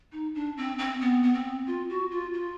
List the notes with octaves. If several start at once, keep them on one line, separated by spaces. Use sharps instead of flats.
D#4
D4
C4
C4
B3
B3
C4
F4
F#4
F4
F4